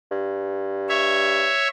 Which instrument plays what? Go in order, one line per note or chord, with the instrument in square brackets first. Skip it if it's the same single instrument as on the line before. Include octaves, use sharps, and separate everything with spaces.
[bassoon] G2
[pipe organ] C#5 E5